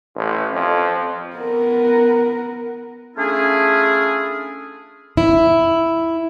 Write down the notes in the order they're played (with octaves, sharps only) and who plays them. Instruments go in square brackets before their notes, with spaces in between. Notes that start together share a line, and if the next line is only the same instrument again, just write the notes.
[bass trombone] A1
F2
[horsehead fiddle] B3 A#4
[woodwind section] A3 C#4 D4 E4 F4 G#4
[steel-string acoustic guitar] E4